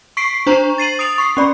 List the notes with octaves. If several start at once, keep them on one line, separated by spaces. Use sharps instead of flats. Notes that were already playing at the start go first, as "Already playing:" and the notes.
C#6 B6 C7 D7
D4 C5 A#5 C#6
A6 C7 D#7 F#7
D#6 A6 D7 F7
C#6 C7
C#4 D5 B5